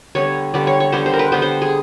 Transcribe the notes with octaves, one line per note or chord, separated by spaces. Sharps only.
D3 G3 B3 C#5
D3 G3 B3 D5
C#5
C#5
D3 G3 B3 C5
C5
A#4
B4
D3 G3 B3 C5
C5
G#4